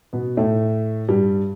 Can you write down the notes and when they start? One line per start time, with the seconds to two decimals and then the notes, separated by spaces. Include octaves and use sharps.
0.13 B2 B3
0.37 A2 A3
1.09 G2 G3